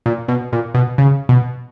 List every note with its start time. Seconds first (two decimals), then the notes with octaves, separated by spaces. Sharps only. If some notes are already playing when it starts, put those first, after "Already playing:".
0.06 A#2
0.28 B2
0.53 A#2
0.75 B2
0.98 C#3
1.29 B2